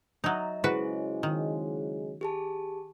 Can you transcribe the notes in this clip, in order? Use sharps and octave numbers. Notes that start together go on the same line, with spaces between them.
F#3 D#4 D#5 E5 A#5
C#3 F#3 G#3 E4 F#4 G#4 B4 C5
D#3
G4 G#4 A5